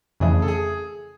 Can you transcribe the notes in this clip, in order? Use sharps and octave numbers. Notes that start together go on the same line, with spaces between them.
F2 C#3 E3 A3 G#4
A4
G#4